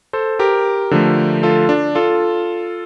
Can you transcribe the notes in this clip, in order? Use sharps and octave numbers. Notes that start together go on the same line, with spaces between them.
A4 C5
G4 A#4
D3 F3 A3
F4 A4
D4
F4 A4